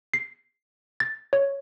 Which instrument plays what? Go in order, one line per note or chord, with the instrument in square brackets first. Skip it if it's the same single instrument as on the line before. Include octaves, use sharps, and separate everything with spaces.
[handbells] C7
A6
C#5